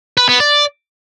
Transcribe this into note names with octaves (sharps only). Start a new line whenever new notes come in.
B4
B3
D5